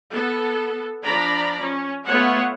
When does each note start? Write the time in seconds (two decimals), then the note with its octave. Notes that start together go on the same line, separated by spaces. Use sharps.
0.12 B3 A4
1.05 F3 D4 D5 A#5 B5
1.60 C#4
2.07 A3 B3 F4 C#5 E5 F#5